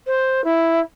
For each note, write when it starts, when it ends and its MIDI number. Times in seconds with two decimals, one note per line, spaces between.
0.07 0.44 72
0.44 0.80 64